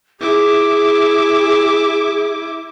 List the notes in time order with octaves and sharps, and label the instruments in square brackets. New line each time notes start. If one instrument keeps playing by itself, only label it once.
[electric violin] E4 D6 [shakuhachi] G#4